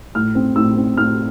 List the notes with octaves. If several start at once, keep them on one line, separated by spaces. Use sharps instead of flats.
A2 F6
C4
A2 E6
C4
A2 F6